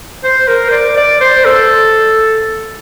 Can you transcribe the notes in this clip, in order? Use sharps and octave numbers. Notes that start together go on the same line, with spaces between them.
C5
A#4
C5
D5
D5
C5
A4